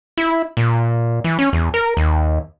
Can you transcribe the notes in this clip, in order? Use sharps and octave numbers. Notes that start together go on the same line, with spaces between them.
E4
A#2
E3
C#4
E2
A#4
D#2